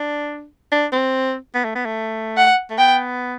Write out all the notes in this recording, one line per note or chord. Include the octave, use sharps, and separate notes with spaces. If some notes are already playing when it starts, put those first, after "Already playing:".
Already playing: D4
D4
C4
B3
A3
B3
A3
F#5
A3
B3 G5